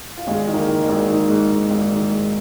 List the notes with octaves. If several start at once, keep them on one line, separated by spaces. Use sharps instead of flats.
F4
G#1 G#3 G#4
D#3
A#3 A#4
D#3
G#3 G#4
G#1
D#3 D#4
G#2
G#2
G#1
D#3
G#2